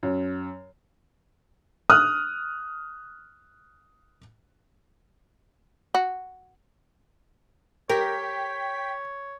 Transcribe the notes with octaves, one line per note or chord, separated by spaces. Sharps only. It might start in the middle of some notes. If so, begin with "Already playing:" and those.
F#2
D#6 F6 F#6
F#4
G4 A#4 C#5 G5 B6